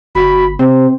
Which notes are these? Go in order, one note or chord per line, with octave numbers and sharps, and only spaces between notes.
G1 F#4 B5
C3 C4 C5